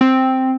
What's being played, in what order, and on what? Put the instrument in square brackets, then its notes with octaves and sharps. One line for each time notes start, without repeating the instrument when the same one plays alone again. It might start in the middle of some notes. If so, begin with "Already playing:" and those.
[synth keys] C4